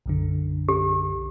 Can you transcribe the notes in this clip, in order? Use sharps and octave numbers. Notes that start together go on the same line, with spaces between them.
B1 F#2 D3
G4